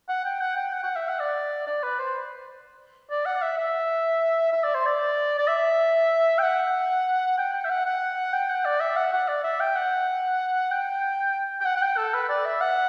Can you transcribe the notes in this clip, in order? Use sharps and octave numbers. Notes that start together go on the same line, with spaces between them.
F#5
G5
F#5
G5
F#5
F#5
E5
F#5
D5
D5
B4
C5
D5
F#5
E5
E5
E5
D5
C5
D5
D5
E5
G5
F#5
G5
G5
E5
F#5
F#5
G5
F#5
D5
E5
F#5
F#5
D5
E5
G5
F#5
G5
G5
F#5
F#5
G5
A4
B4
D5
E5
F#5